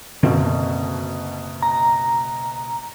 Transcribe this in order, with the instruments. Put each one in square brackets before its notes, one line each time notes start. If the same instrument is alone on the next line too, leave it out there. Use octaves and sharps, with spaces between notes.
[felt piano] F#1 B2 [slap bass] D3 C4
[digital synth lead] A#5